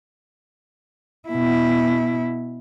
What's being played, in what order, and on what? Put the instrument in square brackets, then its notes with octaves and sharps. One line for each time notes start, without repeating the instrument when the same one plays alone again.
[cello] B2 E4